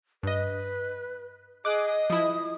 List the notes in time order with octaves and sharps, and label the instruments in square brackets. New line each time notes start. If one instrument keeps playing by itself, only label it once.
[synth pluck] G2 D#5 [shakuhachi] B4
[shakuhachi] G#4 [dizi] D#5 [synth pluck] D6 F#6 D7
[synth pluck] F3 E4 [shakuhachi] D#6